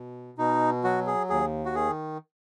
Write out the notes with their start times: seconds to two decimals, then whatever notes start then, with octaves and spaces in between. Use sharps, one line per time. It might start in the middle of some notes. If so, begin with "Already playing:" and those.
Already playing: B2
0.38 B2 D#4
0.84 F#3 F#4
1.07 G#4
1.29 D#2 G#4
1.66 F#4
1.75 D#3 G#4